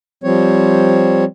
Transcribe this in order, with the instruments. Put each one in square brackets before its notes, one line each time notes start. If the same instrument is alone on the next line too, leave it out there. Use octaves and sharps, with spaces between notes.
[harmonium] F3 G3 C4 C#5